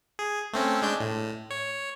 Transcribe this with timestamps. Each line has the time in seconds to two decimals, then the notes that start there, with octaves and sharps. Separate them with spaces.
0.19 G#4
0.53 A3 C4 C#4
0.82 G#3 D4 G6
1.00 A2
1.51 C#5